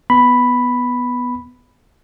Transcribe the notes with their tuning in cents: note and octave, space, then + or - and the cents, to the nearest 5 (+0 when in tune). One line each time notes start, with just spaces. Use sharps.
B3 +0 B5 +0